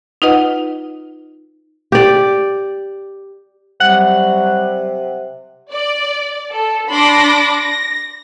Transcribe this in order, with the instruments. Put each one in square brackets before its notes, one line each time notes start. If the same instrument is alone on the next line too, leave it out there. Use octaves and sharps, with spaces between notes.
[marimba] D#4 F4 B4 D#5 F#5
[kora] G4 D5
[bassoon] C3 [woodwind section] F#3 G3 [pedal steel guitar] F#5
[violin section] D5
A4
D4 B5 C6 D6 A#6
A#6